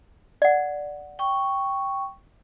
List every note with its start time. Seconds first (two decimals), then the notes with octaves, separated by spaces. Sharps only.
0.42 D5 F#5
1.19 G5 C#6